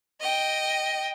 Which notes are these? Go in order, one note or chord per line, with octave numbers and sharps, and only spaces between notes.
D#5 G5